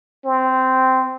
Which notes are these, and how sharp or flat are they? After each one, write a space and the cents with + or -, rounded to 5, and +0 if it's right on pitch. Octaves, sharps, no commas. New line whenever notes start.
C4 -10